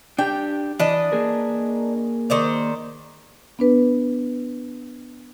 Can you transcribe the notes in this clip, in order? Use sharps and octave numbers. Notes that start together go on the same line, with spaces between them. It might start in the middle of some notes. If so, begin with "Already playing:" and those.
D4 G4 G5
E3 D4 B4 D#5
A#3 G#4 A#4
D#3 C5 D5
B3 D4 B4